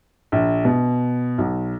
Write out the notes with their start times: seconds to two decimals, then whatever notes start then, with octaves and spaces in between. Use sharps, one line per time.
0.32 A#1
0.65 B2
1.38 B1